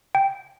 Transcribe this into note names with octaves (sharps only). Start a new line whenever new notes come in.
G5